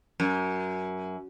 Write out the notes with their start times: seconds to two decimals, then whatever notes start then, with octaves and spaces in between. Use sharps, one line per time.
0.20 F#2